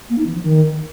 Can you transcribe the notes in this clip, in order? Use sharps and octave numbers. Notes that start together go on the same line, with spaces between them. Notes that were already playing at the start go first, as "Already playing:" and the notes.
A#3
D#4
E3
F3
D#3